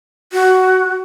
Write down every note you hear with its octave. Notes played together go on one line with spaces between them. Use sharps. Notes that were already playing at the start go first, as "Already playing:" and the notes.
F#4